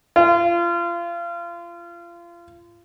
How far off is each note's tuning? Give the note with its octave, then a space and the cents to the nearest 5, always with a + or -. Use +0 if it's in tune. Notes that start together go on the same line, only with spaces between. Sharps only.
F4 -30